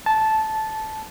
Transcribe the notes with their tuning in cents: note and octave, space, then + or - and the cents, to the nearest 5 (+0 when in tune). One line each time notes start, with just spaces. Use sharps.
A5 -10